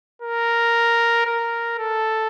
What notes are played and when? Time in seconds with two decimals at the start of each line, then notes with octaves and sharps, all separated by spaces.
0.22 A#4
1.26 A#4
1.79 A4